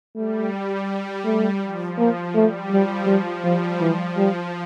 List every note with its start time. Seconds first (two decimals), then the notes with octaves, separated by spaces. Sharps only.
0.16 G3 A3
1.25 A3
1.62 F3
1.98 A#3
2.34 G3 A3
2.70 F3 G3
3.07 G3
3.44 F3 G3
3.80 E3 F3
4.17 F3 G3